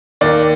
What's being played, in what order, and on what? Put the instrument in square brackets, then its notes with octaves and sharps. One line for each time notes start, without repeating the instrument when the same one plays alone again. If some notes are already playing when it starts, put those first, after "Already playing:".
[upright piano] D#2 D#3 A#3 D5